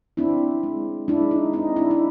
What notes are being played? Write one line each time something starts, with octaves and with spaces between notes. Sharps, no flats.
C4 D4 E4
G#3
G#3 D4 E4
D#4
C4 D#4
D4 E4
E4